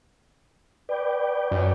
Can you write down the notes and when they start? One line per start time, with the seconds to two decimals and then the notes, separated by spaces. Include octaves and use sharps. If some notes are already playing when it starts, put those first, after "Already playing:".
0.89 B4 D5 G5
1.51 F#2